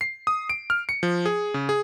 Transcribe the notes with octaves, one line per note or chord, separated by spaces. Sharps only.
C7
D#6
D7
F6
C#7
F3
G#4
C#3
G#4